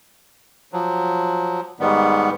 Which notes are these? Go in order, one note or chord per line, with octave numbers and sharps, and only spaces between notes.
F3 F#3
G#2 D#3 G3 B3